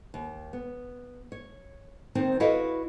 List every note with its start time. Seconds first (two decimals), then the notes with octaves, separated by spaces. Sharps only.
0.14 D#2
0.53 B3
1.32 C#5
2.15 D#3 C4 D#4 C5
2.40 E4 F#4 A4 B4 D#5 F5